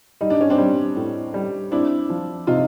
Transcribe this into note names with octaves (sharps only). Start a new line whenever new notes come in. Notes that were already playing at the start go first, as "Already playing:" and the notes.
G3 D#4
D4
C#4
C4 D4
G3
A2
G3
C4 D4 E4
F3
C3 D#4 F4